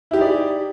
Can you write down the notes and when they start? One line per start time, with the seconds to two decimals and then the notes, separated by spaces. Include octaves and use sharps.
0.11 E4
0.13 G4
0.16 D#4
0.18 G#4
0.21 D5